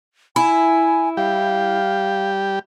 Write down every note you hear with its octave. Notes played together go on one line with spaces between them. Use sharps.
E4 G#5
G3 G4 F5